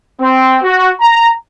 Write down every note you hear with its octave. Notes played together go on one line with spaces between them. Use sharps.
C4
F#4
A#5